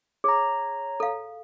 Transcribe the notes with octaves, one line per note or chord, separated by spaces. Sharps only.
G#4 C#5 A#5
A4 F5